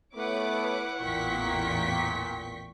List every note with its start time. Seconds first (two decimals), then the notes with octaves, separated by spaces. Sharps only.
0.16 A3 B3 E4 B4 C#5 F#5 D6
1.01 A1 E2 A#2 G5 C#6 B6